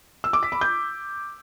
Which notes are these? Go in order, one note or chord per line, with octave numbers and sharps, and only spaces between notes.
E6
D6
B6
B5
G6